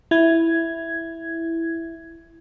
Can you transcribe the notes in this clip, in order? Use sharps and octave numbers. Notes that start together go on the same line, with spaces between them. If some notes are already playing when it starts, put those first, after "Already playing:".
E4 G#6